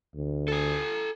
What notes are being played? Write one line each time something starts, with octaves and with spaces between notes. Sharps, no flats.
D2
A4 G#5